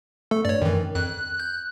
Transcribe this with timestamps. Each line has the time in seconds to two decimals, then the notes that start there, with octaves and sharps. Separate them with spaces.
0.31 A3 A4
0.45 G2 C#5 D5
0.61 F#2 D#3 E3
0.95 F2 F#6
1.39 G6